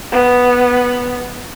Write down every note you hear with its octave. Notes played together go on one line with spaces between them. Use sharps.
B3